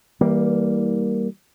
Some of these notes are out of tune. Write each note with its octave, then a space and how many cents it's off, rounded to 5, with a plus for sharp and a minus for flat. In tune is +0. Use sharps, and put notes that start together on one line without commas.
E3 -30 G3 +0 A#3 +0